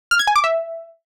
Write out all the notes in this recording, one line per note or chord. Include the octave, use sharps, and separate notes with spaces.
F6
G#6
G#5
D6
E5